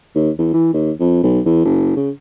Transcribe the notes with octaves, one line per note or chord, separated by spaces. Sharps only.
D#2
E2
E3
D#2
F2
B1
E2
F#1
C#3